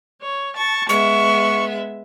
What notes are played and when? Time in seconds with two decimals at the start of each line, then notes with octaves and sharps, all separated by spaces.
0.19 C#5
0.55 A5 C#6
0.89 G#3 B3 E5 C#6